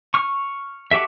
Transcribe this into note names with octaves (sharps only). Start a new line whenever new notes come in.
C#6 F6
F#4 G4 A4 E5